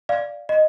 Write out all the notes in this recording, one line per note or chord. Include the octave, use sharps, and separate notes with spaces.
D5 F5
D#5